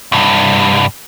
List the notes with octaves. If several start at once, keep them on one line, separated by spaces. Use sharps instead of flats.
C2 G2